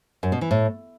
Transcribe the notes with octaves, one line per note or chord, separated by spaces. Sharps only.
F#2
B2
E3
A2